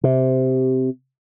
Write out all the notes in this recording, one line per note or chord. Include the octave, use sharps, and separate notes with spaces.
C3